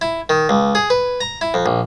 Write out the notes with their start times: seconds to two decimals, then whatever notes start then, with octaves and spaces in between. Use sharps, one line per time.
0.01 E4
0.29 D#3
0.49 C#2
0.75 G#4
0.90 B4
1.21 A#5
1.41 E4
1.54 F2
1.66 A#1